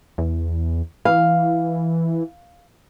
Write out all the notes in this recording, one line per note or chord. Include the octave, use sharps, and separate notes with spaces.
E2
E3 F5